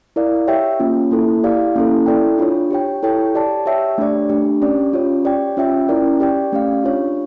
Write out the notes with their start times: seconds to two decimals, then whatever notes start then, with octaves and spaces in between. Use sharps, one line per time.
0.16 E4 A#4 D5 F5
0.48 G4 C#5 E5 G5
0.80 A#3 C#4 F4
1.11 A#3 E4 A4
1.43 E4 G4 D5 F5
1.76 A#3 C#4 E4 A4
2.06 E4 A4 D5 G5
2.38 D4 F4 C#5
2.71 G4 C#5 G5
3.03 E4 A4 C#5 G5
3.35 G4 D5 A5
3.66 G4 C#5 E5 G5
3.98 A3 D4 G4 D5
4.29 A3 D4 G4
4.62 C#4 G4 D5
4.93 C#4 F4 C#5
5.25 G4 D5 G5
5.57 C#4 F4 C#5 E5 G5
5.88 C#4 E4 A#4 D5 G5
6.20 G4 D5 G5
6.52 A3 C#4 G4 D5 F5
6.84 D4 F4 C#5